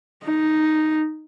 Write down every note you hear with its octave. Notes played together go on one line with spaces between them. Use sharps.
D#4